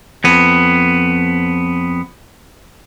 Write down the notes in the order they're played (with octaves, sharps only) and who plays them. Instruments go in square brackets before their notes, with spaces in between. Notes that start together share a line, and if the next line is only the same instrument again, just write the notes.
[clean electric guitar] F2 B3